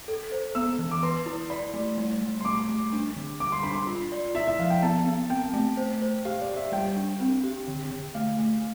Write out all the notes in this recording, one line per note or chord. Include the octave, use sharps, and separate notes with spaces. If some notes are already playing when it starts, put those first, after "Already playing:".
A4
C5
B3 E6
E3
D6
B4 C6
E4
D5 B5
A3
G3
G3
C6
A3 D6
A3
D4
D3
G3 D6
C6
D4 B5
C6
F4
D5
E4 E5
E5
F3 F5
G5
B3 A5
B3
C4 G5
A3
C5
C5
G4 F5
D5
G4
E5
G3 G5
D4
C4
G4
D3
D3
A3 F5
A3